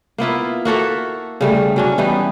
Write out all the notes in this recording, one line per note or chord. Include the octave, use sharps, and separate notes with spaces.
A#3 B3 E4 F4
A#3 F#4 A4 E5
C#3 G3 A3
F#3 C#4 D4
E3 G3 B3 D#4